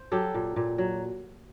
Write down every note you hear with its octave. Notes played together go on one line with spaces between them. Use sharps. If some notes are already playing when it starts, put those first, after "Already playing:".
Already playing: C5
F#3 G4 A4
A#2
A#2
F#3